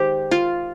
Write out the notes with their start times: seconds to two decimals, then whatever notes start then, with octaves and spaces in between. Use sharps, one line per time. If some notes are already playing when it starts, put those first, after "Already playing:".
Already playing: D#3 G#3 G4 C5
0.31 F4